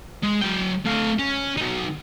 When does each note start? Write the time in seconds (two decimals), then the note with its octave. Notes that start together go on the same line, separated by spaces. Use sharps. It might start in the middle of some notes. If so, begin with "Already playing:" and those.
0.23 G#3
0.42 F#3 G5
0.86 A3 F5
1.19 C#4
1.57 F#3 D#4